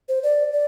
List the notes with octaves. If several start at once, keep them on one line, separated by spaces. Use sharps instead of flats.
C5
D5
D5